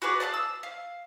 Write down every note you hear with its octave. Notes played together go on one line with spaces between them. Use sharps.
F#4 G#4 B4 D5
D5 F5 A5 D#6
E6
F5